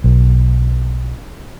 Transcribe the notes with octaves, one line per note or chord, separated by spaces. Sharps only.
B1